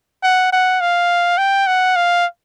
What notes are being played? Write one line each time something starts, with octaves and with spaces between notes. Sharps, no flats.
F#5
F#5
F5
G5
F#5
F5